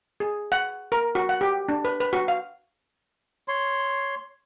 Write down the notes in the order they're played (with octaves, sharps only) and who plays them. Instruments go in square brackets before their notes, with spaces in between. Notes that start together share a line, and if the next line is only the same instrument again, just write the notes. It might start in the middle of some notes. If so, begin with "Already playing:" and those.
[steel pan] G#4
F#5
A#4
F#4
F#5
G4
D4
B4
B4
F#4
F5
[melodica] C#5 C6